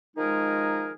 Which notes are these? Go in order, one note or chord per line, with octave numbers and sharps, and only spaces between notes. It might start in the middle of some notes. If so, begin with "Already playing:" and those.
D#3 F3 G#3 D#4 G#4 A#4